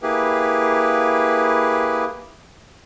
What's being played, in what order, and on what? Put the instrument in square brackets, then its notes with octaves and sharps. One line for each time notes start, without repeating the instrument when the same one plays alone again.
[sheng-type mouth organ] A#3 E4 G4 G#4 B4